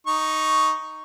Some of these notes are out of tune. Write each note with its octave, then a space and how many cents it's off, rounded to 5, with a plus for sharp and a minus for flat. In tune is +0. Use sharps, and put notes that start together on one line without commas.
D#4 +0 C#6 +0